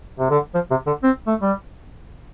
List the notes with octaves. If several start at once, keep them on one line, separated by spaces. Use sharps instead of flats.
C3
D3
F3
C3
D3
C4
A3
G3